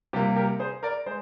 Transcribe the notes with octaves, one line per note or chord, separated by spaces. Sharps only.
C3 G3 A#3 G4
G4 A#4
G#4 C5
A#4 D5
G#3 C5